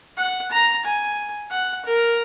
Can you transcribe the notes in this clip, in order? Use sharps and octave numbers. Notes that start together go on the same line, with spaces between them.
F#5
A#5
G#5
F#5
A#4